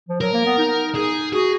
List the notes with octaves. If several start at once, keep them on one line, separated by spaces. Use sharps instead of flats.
F3
F#3 A#4
A#3
B3
D#4
G#4
F#4 G#4